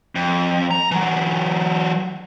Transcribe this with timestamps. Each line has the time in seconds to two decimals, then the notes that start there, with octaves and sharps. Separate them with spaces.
0.15 F2
0.71 A#5
0.91 E3 F#3